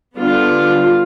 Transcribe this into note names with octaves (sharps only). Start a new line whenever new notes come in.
D3 G3 B3 D4 F4